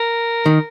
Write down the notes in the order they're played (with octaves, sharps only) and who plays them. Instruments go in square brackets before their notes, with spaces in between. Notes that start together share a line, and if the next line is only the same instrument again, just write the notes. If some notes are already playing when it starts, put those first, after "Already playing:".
Already playing: [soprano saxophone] A#4
[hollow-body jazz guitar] D#3